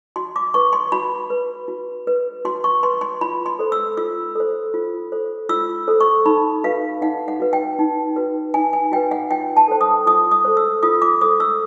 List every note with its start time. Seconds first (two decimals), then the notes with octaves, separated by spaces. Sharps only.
0.16 F#4 C6
0.36 D6
0.54 B4 C#6
0.73 C6
0.92 F#4 B5
1.30 B4
1.68 F#4
2.07 B4
2.45 F#4 C6
2.64 C#6
2.83 B4 C6
3.01 C6
3.21 F4 B5
3.46 C6
3.59 A4 C5
3.72 E6
3.97 F4 E6
4.35 A4 C5
4.74 F4
5.12 A4 C5
5.49 F4 E6
5.88 A4 C5
6.00 C#6
6.26 D#4 B5
6.64 F#4 B4 F5
7.01 D#4 F#5
7.28 F#5
7.40 F#4 B4
7.53 G5
7.79 D#4
8.16 F#4 B4
8.54 D#4 G#5
8.73 G#5
8.92 F#4 B4 G5
9.11 F#5
9.30 F4 G5
9.56 A5
9.68 A4 C5
9.81 D#6
10.06 F4 D#6
10.31 D#6
10.45 A4 C5
10.57 E6
10.83 F4 D#6
11.02 D6
11.21 A4 C5 D#6
11.40 E6